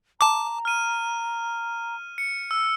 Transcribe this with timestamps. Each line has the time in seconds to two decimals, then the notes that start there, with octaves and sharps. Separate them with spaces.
0.21 A5 A#5 D6
0.65 F6 D#7
2.18 C#7
2.51 E6